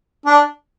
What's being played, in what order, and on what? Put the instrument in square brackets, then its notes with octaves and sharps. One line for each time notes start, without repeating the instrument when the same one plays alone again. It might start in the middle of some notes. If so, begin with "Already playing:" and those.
[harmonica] D4